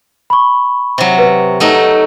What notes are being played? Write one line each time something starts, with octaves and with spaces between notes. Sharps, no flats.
B5 C#6
C3 F#3
B4
F#3 A3 D#4